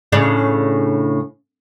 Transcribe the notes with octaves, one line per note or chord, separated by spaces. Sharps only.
A2 C#3 D4